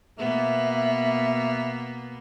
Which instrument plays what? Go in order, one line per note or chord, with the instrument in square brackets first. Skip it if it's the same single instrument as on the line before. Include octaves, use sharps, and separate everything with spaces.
[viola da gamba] B2 A#3 B3 [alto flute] E5